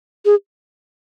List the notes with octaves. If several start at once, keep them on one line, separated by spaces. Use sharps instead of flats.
G#4